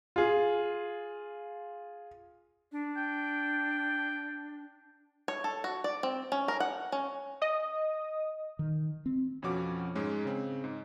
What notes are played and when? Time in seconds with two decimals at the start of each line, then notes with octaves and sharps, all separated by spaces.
0.16 F4 G#4
2.72 D4
2.97 G5
5.28 C#5
5.44 A4
5.64 F#4
5.84 D5
6.03 C4
6.32 C#4
6.48 A#4
6.60 F#5
6.92 C#4
7.42 D#5 D#6
8.59 D#3
9.06 C4
9.42 F2 B2 F3 C#4 F#4 D6
9.95 G#2 G#3 C#4
10.25 C#3 C4
10.64 G#2